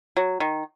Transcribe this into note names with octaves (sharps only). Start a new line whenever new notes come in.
F#3
D#3